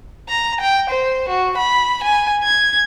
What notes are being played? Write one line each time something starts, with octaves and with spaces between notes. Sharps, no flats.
A#5
G5
C5
F#4
B5
G#5
G#6